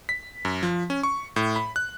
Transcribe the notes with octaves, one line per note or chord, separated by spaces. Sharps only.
B6
F#2
F3
C#4
C#6
A2
B5
F#6